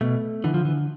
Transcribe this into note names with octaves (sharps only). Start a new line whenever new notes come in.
B2 A3
D3 E3
F3
E3